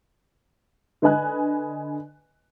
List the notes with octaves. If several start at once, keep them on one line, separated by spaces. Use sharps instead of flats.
D3 B4 D#5 G#5 F#6